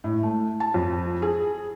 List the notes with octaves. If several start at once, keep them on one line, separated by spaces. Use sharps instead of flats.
A2
A3
A5
F2
G#4